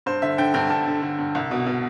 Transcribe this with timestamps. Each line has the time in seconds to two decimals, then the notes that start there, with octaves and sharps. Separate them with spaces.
0.06 G2 C5
0.22 D3 E5
0.38 D3 G5
0.54 G2 G5
0.70 G2 A5
0.87 D3
1.02 D3
1.19 G2
1.35 C2
1.51 B2
1.66 B2